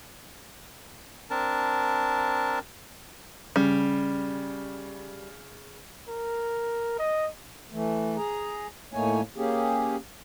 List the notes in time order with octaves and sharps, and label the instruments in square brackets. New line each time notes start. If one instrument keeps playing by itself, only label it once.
[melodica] C4 D4 A#4 A5
[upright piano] C#3 [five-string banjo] G3
[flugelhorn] A#4
D#5
[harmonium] E3 A3
G#4 A#5
A2 A3 A#3 D#4 C#5 G#5
A#3 C#4 G4 G#4